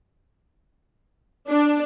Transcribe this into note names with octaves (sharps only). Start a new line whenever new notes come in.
D4